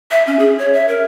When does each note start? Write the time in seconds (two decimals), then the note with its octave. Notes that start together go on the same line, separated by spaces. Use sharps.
0.11 E5
0.27 C#4
0.39 G#4
0.58 C#5
0.73 E5
0.88 A#4